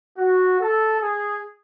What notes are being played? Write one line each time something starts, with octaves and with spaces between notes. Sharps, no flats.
F#4
A4
G#4